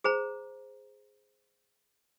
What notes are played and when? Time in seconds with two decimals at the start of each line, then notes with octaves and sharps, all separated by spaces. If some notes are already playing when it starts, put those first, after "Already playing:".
0.04 G#4 C5 A#5